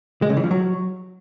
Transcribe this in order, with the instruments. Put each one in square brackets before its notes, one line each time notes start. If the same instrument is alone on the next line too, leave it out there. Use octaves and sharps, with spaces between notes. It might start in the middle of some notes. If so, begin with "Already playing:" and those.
[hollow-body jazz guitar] G#3
C#3
E3
F3
F#3